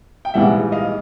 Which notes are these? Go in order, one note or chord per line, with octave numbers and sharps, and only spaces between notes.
G5
A#1 G#2 E3 G3 E5 F#5
D#5 F5